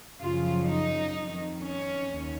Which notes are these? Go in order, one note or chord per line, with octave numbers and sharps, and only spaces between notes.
F#2 C#3 F3 F4
D#4
F2 D#3
C#4
D#2 D#3